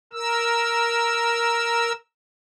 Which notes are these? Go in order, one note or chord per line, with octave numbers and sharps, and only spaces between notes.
A#4 E6